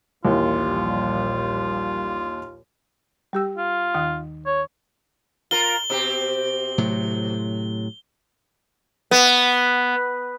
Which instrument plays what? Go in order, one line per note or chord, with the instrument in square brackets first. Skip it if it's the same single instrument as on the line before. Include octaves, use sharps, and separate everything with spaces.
[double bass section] A#1 G3 [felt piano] D#2 E3 [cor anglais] F4
[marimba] G3 G4 E6
[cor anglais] F4
[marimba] D#2 D#3 D#6
[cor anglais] C#5
[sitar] F4 A#4 [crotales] G7
[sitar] B2 C4 G4
[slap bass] A2 C3 F#3
[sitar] B3